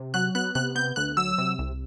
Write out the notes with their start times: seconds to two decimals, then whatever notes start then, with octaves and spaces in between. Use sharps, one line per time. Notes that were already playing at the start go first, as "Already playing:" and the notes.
Already playing: C3
0.14 F#3 F#6
0.35 B3 F#6
0.55 C3 F#6
0.75 B3 G6
0.96 D2 F#6
1.17 F#3 E6
1.38 C3
1.59 C2